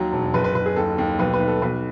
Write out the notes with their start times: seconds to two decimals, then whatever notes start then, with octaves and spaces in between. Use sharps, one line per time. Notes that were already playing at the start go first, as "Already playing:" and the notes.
Already playing: D#2 F#3
0.12 E1
0.34 F#1 B4
0.44 B4
0.55 F#1 B4
0.66 G#4
0.76 D#2 A4
0.98 D#2
1.19 B1 B4
1.34 B4
1.40 B1
1.48 A4
1.62 B1 B4